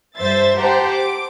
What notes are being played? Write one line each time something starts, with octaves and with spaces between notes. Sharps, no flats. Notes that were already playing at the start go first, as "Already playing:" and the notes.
G2 C5 E5 A6
G4 C5 F#5 G5 A5 A#5
D6